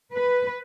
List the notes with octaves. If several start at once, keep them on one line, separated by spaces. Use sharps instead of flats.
B4